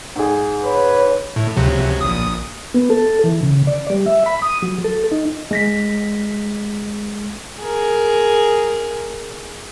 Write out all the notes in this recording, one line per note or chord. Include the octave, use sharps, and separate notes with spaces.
G#2 G#4
B4 C#5
A2
C#2 C3 F#3
A#1 D#6
B3
A4
E3
C#3
D5
G3
E5
B5
D#6
F#3
A4
D#4
G#3 A#6 B6
G#4 A#4